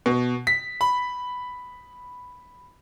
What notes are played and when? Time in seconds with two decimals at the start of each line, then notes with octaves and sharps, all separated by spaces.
0.06 B2
0.47 B6
0.81 B5